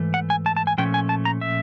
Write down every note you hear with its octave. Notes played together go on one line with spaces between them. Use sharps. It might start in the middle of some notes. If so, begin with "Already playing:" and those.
Already playing: G#2 E3 A3
F#5
G#5
A5
A5
G#5
A#2 F3 A3 C#4 G5
G#5
A5
A#5
E5